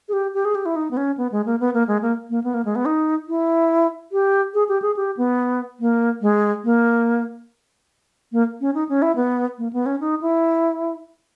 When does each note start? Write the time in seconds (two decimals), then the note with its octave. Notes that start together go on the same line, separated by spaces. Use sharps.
0.09 G#4
0.13 G4
0.34 G4
0.45 G#4
0.55 G4
0.66 E4
0.76 D#4
0.91 B3
0.97 C#4
1.18 B3
1.32 G#3
1.46 A#3
1.60 B3
1.74 A#3
1.88 G#3
2.02 A#3
2.30 A#3
2.44 B3
2.54 A#3
2.65 G#3
2.75 B3
2.85 D#4
3.28 E4
4.12 G4
4.54 G#4
4.69 G4
4.82 G#4
4.97 G4
5.17 B3
5.80 A#3
6.22 G#3
6.64 A#3
8.32 A#3
8.61 C#4
8.75 D#4
8.89 C#4
9.02 E4
9.16 B3
9.58 A#3
9.73 B3
9.86 C#4
10.00 D#4
10.22 E4